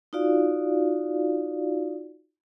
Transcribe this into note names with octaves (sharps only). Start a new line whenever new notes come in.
D#4 F4 F#4 D5 F5